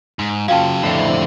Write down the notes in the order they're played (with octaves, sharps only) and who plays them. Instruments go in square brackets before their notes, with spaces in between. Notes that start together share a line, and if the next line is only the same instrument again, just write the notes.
[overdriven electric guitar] G#2
[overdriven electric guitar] C#3 F#3 [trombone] F4 [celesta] F5 G5 A5
[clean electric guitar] F2 A2 D3 [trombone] E4 [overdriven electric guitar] C5 E5